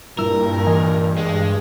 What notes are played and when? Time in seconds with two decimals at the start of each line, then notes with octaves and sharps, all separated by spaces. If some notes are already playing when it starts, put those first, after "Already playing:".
0.18 G2 A#2 G3 E4 A#4 E6
0.67 E3 D#5 G#5
1.18 G#3